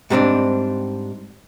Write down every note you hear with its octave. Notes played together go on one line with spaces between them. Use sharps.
G#2 G3 A3 B3 C4 D4